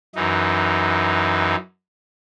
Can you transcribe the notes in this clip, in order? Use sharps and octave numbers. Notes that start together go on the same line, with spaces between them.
F#2 E3 D#4